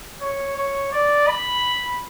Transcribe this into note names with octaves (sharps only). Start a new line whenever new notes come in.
C#5
C#5
D5
B5